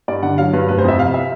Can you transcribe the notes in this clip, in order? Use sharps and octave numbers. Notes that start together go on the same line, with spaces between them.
G2 D5
D3 F#5
F#3 F5
G2 B4
F1 B4
C5
F2 E5
C3 F5
E5